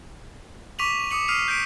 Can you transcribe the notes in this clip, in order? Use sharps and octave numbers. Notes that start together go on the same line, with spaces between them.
C#6 D6 B6 D#7 F7 F#7
D6 D#6 C#7 F#7
D#6 F6 C7 D#7 F7
G6 B6 D7